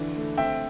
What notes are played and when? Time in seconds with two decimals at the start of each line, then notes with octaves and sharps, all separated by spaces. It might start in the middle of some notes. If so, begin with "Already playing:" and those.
Already playing: D3 E3
0.16 A3
0.37 C4 E5 G5